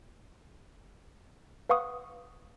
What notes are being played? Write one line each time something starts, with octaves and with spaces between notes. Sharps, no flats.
B4 F5 F#5 C#6 D#6